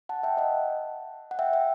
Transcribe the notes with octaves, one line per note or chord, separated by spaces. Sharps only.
F#5 A5
E5 G5
D#5 F#5
F#5
E5 G5
E5 G5